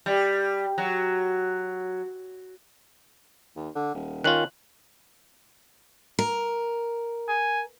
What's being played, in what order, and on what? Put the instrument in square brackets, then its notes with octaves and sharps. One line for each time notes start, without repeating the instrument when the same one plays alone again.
[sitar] G3
F#3
[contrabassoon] D#2
D3
D#1
[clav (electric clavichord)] D#3 C#4 F4 [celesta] F#6 F#7
[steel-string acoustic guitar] A#4
[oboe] G#5